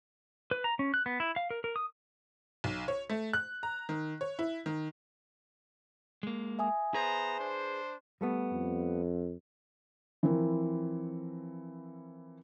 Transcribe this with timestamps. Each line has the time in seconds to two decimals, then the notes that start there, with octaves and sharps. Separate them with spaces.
0.51 B4
0.64 A#5
0.79 C#4
0.94 F#6
1.06 B3
1.20 E4
1.36 F5
1.51 A#4
1.64 A#4
1.76 D#6
2.64 B1
2.88 C#5
3.10 A3
3.33 F#6
3.63 A#5
3.89 D#3
4.21 C#5
4.39 E4
4.66 D#3
6.23 G#3 A#3
6.59 E5 G#5 D#6
6.94 B3 G#4 B4 C5 A#5
7.40 D4 C5
8.21 G3 A3 B3
8.52 F2
10.23 E3 F3 C4 E4 A#4